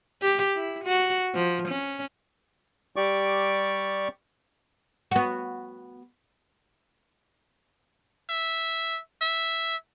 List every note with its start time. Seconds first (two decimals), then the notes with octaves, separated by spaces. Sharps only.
0.22 G4
0.55 E4
0.84 F#4
1.35 F3
1.69 C#4
2.96 G3 G4 D5 C#6 D6
5.11 B3 F#4
8.30 E5
9.22 E5